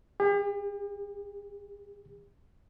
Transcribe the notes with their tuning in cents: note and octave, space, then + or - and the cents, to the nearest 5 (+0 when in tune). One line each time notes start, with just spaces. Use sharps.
G4 +45